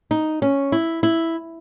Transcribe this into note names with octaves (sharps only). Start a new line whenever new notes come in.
D#4
C#4
E4
E4